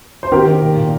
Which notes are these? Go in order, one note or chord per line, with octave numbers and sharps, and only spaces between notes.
C5
D#3 G4 A#4
D#3
A#2
A#2